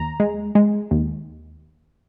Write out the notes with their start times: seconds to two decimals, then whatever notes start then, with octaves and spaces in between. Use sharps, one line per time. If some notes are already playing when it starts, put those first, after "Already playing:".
Already playing: D#2 A#5
0.20 G#3
0.55 G#3
0.91 D#2